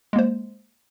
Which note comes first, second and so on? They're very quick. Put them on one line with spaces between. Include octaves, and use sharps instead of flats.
G#3 A#3 C5